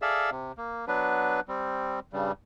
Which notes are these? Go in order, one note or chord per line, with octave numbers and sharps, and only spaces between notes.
G#4 A4 D5 E5 F5 E6
C3
A#3
F#3 B3 D4 B4
G3 C4
G2 C#3 G3